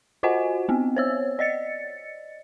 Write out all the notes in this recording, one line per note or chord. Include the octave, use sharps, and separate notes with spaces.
F4 F#4 C5 D#5 F#5 G#5
B3 C4
C5 C#5 E6
D5 D#5 A6 C#7